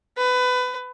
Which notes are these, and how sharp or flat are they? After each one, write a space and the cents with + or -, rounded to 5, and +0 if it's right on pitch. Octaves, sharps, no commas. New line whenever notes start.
B4 +20